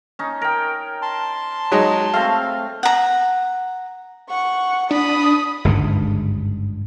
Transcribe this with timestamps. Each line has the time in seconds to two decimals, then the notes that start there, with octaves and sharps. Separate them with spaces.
0.19 C#4 D#4
0.41 A#4 G5
1.02 A5 C6
1.72 F#3 G#3 D#4
2.14 A3 C4 F5
2.83 F#5 A#5
4.30 F#5 C#6
4.91 D4 B5 D#6
5.65 G1 C#2 G#2 D3